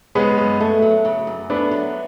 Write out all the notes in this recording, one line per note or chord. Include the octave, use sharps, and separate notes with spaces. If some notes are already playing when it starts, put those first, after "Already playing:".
C#3 G#3 B3
F#2
A3
F#3
C#3
F#2
A3 B3 D4
F#3